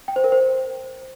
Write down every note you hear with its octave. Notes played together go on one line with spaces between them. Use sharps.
G5
C5
A#4
C5